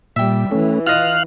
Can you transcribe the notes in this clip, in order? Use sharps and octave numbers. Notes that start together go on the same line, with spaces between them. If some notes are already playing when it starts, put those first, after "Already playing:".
A#2 G3 E5 G5
E3 A3 C#4
F4 D#5 F5 F6 F#6